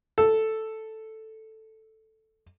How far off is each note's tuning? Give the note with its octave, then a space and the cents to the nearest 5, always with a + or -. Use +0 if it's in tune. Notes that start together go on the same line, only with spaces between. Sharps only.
A4 +0